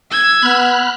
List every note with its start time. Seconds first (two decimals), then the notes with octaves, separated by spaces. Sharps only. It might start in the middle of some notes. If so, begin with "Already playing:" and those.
0.11 E6 G#6
0.42 B3 B5 F6 F#6